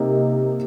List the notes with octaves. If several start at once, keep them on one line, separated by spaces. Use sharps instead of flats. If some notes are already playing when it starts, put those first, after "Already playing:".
Already playing: C3 A#3 D#4